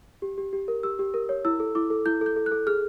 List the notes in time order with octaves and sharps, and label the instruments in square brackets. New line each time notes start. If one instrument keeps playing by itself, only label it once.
[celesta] G4
G4
G4
A#4
G4 E6
G4
A#4
C#5
E4 E6
A4
E4 D6
A4
E4 G6
A4 G6
A4
F#6
A4
G#4 F6